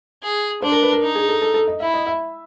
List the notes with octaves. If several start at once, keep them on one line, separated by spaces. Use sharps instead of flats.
G#4
D4 C5
A#4
B4
A#4
D#4
G#4
A4
A4
A4
D#5
E4 E5
D#5
E5